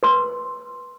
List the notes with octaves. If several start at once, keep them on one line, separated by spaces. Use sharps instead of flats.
B4 C6 E6